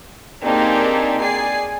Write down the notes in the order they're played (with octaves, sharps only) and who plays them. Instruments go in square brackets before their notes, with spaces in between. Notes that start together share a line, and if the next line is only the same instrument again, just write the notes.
[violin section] A#3 C4 D4 D#4 G4 G#4
G#4 D5 G#5 C7